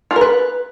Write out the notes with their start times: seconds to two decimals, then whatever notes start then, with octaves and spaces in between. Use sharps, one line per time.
0.11 F4
0.16 A#4
0.21 B4